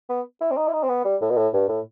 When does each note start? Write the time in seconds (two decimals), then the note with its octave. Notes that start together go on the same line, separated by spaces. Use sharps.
0.09 B3
0.41 E4
0.50 C4
0.57 D#4
0.68 E4
0.73 D#4
0.83 C4
0.89 B3
1.05 G3
1.21 A2
1.30 B2
1.37 A2
1.53 G2
1.69 A2